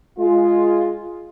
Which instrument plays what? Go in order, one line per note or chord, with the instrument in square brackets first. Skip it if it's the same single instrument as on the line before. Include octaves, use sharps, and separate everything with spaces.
[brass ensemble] G#3 F4